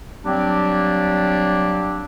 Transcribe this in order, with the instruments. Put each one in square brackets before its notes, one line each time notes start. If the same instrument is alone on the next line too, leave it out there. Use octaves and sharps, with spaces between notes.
[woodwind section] F#3 G3 A#3 C4 D4 G4